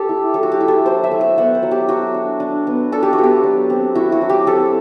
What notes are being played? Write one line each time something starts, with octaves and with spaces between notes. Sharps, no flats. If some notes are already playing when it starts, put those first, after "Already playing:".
Already playing: G4 A4
E4
F#3 A4
F#4
G4
E4
A4
F#3 C5
E5
A3
E5
B3 F#5
C5
F#3
G4
F#3 F#4
D4
D4
B3
D4 A4
G4
F#4
B3
G4
F#3
C4
E4 F#4
F#4
F#3
G4
C4 A4